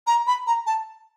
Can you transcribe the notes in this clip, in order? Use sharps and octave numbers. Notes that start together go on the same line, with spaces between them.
A#5
B5
A#5
A5